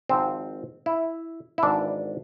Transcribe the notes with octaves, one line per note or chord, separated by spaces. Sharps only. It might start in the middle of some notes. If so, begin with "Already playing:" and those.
G#1 G#2 F3 C4
E4
E4
G#1 G#2 E3 D4